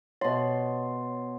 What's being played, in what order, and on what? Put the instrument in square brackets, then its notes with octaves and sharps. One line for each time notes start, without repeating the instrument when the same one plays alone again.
[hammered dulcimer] B2 C6 [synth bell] C#5